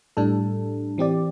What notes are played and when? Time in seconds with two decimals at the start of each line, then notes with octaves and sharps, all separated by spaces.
0.17 A2 G3 D4 A4
0.98 E3 C4 G4 D5